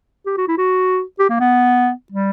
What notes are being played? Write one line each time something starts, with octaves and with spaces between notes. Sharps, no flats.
G4
F#4
E4
F#4
G4
A#3
B3
G3